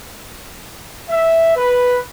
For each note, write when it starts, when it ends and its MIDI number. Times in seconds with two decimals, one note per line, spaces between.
1.10 1.54 76
1.56 1.98 71